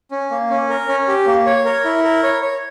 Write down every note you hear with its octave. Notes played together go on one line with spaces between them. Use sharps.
C#4
A#3
C#4
A#4
C#4
G4
A#3
C#5
A#4
E4
A#4
C#5
C#5